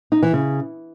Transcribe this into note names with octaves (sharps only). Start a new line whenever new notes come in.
D#4
E3
C#3